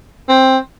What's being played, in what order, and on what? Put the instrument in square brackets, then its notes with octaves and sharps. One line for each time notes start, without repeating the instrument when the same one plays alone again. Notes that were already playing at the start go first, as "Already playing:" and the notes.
[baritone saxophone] C4